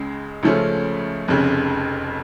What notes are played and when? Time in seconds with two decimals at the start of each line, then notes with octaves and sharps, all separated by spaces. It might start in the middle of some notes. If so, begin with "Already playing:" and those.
Already playing: C#2 C#3 G#3
0.43 C#2 C#3 F3 A3 C#4
1.28 F1 F2 C#3